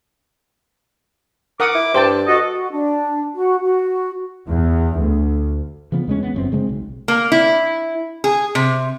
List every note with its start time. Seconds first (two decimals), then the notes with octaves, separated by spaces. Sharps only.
1.60 A#4 F#5 D6 D#6
1.75 E4
1.94 G2 C5 G5 A5
2.28 F#4 A4 D#5
2.49 F#4
2.71 D4
3.35 F#4
3.62 F#4
4.48 E2
4.98 D2
5.92 C#3 E3 F3 B3
6.07 E2 G#3 C#4
6.23 B3
6.34 G1 F#2 C4
6.52 C#3 G#3 A#3 C4
6.69 B1
7.08 A#3
7.32 E4
8.24 G#4
8.55 C3